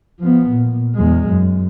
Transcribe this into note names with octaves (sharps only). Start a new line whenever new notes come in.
F3 B3
A#2
E2 G#3
F#2